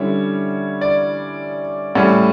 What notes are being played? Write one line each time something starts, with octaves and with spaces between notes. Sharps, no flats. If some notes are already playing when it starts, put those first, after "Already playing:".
Already playing: D3 G3 C#4 E4 C#5
D5
A2 G3 C#4